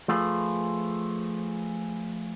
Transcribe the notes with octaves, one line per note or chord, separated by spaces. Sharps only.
F3 A3 F4 G#4 B4